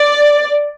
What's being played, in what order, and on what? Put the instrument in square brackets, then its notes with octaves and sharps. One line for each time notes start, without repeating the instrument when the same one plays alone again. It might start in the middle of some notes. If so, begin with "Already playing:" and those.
Already playing: [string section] D5